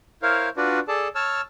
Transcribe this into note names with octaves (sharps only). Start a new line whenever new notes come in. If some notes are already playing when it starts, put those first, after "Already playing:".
E4 A#4 C5 C#5 F5
D4 F4 F#4 B4 D5
G#4 A4 D5 A5
C#5 A5 E6 F6